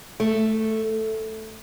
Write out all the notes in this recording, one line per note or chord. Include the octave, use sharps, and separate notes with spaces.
A3